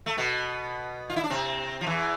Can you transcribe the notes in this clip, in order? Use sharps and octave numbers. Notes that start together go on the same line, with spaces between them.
A3
B2 B3
F4
E4
D4
C3 C4
F3
E2 E3